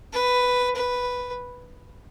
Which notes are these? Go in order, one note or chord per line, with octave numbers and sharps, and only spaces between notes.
B4
B4